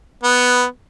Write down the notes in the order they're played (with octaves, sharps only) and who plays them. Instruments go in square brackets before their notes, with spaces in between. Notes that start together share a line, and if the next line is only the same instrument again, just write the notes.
[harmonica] B3